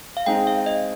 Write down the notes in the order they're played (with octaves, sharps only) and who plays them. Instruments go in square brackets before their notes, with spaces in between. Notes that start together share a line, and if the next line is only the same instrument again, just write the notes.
[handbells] F5
[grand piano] G#3 C4 D#4 G#4 [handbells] G5
[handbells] F5
D#5